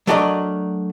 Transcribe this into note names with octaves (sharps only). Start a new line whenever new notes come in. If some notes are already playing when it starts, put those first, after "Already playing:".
F#3 A3 D4 F#4 A#4 D#5